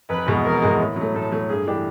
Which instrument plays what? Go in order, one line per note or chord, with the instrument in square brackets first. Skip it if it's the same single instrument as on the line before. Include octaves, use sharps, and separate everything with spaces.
[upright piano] F1 [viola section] B4
[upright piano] E2 B2 G#3
[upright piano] F1 [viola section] A#4
[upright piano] E2 B2 G#3
A2
F#3 A3
[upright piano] A2 [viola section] A4
[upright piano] F#3 A3
[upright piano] G2 [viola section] G#4
[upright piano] E3 A3 D4 G4